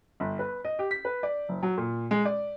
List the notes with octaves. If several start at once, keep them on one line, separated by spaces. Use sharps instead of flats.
G1
B4
D#5
G4
B6
B4
D5
F#1
F#3
A#2
G#3
D5